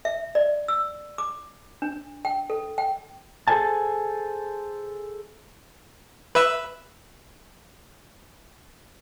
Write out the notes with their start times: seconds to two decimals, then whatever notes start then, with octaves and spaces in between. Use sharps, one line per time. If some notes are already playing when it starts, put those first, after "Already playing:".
0.05 E5
0.35 D5
0.68 E6
1.18 D6
1.82 D4
2.25 G5
2.50 A4
2.78 G5
3.48 G#4 A4 B4 C5 G#5 A5
6.35 B4 E5 E6